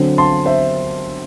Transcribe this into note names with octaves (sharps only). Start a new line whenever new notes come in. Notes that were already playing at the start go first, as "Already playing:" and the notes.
Already playing: D3 F#3 C4
A5 C6
C5 E5